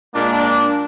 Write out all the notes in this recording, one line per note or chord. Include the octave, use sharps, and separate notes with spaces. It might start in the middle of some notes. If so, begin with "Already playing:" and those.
A#2 G#3 A#3 D4